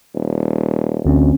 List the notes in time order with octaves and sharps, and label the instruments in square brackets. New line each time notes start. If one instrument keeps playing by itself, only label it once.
[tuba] D#1
[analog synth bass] D2 [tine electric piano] D3 C4 C#4